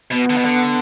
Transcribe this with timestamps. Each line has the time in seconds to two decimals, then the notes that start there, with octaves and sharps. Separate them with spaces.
0.11 B2 B3
0.30 D3
0.37 B2
0.45 D3